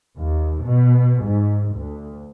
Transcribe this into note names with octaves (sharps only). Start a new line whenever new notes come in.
D#2
B2
G#2
D2